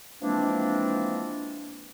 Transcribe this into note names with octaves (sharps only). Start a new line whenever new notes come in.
E3 F3 G#3 A#3 C4 D4